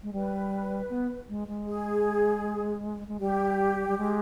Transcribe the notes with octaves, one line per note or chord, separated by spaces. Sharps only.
G#3
G3 B4
B3
G#3
G#3
G#4
G#3
G3 G4
G3
G#3